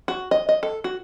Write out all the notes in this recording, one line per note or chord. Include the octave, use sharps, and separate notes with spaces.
F#4
D#5
D#5
A4
F#4